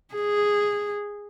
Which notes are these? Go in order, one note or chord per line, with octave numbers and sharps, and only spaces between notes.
G#4